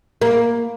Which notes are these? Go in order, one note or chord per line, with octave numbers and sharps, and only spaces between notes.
A#3